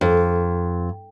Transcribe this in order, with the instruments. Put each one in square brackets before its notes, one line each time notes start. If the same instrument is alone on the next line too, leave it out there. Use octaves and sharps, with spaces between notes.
[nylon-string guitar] F2